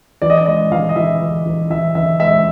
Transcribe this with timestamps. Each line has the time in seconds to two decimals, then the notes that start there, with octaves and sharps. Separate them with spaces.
0.22 E3 D5
0.30 D#5
0.37 D5
0.46 G#3 D#5
0.72 E3 F5
0.89 D#5
0.96 E3 E5
1.21 E3
1.46 E3
1.70 E3 E5
1.95 E3 E5
2.20 G#3 E5